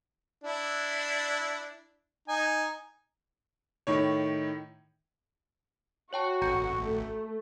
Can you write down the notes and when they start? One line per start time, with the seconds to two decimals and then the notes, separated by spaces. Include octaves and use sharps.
0.44 D4 E4
2.28 D#4 G#5
3.87 A2 D#3 C#5
6.13 F#4 C#5 G5 A5
6.42 A1 A#5 G6 C#7
6.79 A3